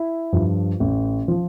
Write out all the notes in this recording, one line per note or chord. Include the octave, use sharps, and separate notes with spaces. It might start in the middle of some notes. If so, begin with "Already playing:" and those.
Already playing: E4
G2 F3
A1
F3